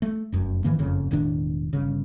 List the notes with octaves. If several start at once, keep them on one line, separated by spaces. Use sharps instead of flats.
A3
F1 F#2
G#2 D#3 E3 A#3
F#1 F2 C#3
E1 A2 D#3 D4
G1 C#3